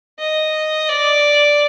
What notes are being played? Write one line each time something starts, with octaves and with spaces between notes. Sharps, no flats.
D#5
D5